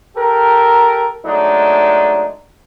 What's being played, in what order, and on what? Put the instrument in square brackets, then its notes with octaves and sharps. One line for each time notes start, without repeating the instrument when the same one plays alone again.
[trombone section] G4 A4 A#4
F#3 G#3 A3 D4 D#4